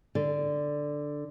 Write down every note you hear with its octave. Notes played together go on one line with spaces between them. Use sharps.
D3